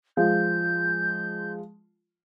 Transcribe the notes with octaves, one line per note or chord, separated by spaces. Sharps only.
F3 G#3 F4 G6